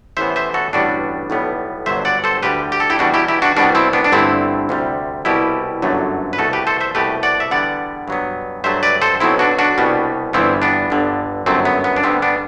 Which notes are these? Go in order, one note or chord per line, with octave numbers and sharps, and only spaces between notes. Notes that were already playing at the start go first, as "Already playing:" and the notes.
A1 A2 E3 B3 C5 E5
C5 E5
F#4 A4
A1 G2 D3 G3 B3 D4 F#4
B1 A2 G3 B3
G1 G2 D3 F#3 C5 E5
D5 F#5
A4 C5
D2 D3 G3 G4 B4
G4
A4
E4 G4
E2 B2 G3 D4 F#4
E4 G4
E4 G4
D4 F#4
C2 B2 G3 B3 D4 F#4
C4 E4
B3 D4
D4
G1 G2 D3 A3 C4 E4
D2 C3 G3
C2 B2 G3 E4 G4
G1 F#2 D3 F#3 A3
B4
C2 B2 A3 F#4 A4
G4 B4
A4 C5
C5 E5
C2 B2 A3 G4 B4
D5 F#5
E5
E2 D3 G3 B3 D5 F#5
G2 F#3 B3
G2 F#3 A3 C5 E5
B4 D5
A4 C5
B1 B2 F#3 B3 C4 E4
D4 F#4
D4 F#4
C2 B2 G3 B3
G1 G2 E3 G3 B3 C4 E4
B3 D4
G1 G2 D3
G1 F#2 F#3 A3 C4
B3
B3
D4
G2 D3 G3 B3 C4
B3 D4